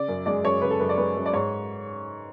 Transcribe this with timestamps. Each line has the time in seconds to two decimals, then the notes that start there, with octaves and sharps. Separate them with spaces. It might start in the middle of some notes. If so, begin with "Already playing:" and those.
Already playing: C#3 D5
0.08 F#2
0.26 G#3 D5
0.44 F#2 C#5
0.61 C#3 B4
0.70 A4
0.80 F#2 B4
0.89 D5
0.97 G#3 B4
1.16 F#2
1.26 D5
1.33 G#2 C#5